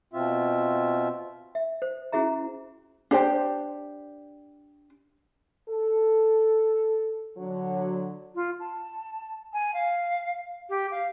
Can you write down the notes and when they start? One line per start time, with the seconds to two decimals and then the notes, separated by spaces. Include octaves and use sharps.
0.13 B2 C4 F4 E5
1.55 E5
1.82 C5
2.12 C#4 E4 F#4 G#4 E5 A#5
3.11 D4 G4 C5 G5
5.69 A4
7.37 D3 F#3
8.35 F4
8.60 A5
9.53 G#5
9.74 F5
10.69 G4
10.91 F5